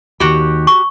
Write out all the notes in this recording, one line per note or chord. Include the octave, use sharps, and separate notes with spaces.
D#2 D#3 F#4 G4
C#6